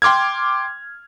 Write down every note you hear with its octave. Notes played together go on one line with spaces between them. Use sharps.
G5 C6 D6 F6 G#6